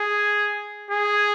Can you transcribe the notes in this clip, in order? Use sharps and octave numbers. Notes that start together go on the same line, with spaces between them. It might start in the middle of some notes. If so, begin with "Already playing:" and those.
Already playing: G#4
G#4